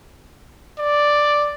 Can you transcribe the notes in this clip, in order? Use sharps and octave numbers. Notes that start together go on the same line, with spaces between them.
D5